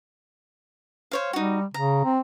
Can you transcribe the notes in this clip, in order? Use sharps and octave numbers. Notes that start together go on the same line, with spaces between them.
C5 C#5 F5
G3 D#4 F#4
C#3 A#5
C4